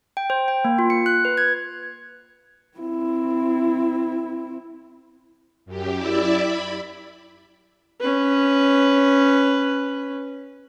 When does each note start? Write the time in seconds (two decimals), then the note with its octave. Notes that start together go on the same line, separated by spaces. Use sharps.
0.17 G5
0.30 C5
0.48 G5
0.65 A#3
0.79 F4
0.90 C#7
1.06 F#6
1.25 B4
1.37 G#6
2.78 C4 E4
5.66 F#2 G4
5.96 E4 D5 E5
6.34 B5
8.01 C#4 B4